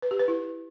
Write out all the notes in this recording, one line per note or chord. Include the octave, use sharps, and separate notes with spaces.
B4
G4
B4
E4